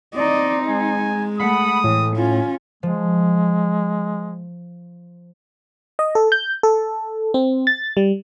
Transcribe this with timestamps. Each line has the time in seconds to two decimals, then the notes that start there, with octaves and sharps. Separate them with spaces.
0.15 C4 D#4 D5 D#5
0.67 G#3 G#5
1.39 A3 F#5 B5 D#6
1.84 A2 E3
2.16 C#4 F4
2.83 F3 G#3
5.99 D#5
6.15 A4
6.32 G6
6.63 A4
7.34 C4
7.67 A6
7.97 G3